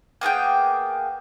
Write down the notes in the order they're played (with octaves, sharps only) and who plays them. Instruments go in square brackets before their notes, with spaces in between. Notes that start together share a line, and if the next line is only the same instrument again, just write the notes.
[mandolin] A#3 B3 G#4 G5